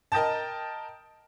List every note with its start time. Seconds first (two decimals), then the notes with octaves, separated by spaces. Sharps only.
0.12 A#4 D#5 G5 A5